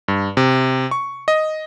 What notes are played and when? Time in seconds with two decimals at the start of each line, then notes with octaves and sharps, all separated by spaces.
0.08 G2
0.37 C3
0.91 C#6
1.28 D#5